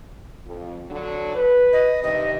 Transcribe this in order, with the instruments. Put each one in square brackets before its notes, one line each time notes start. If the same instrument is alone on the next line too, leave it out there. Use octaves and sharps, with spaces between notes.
[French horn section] F2
D3 F#3 D4
B4
[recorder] D#5
[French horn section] G2 C3 D#3 [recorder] D#5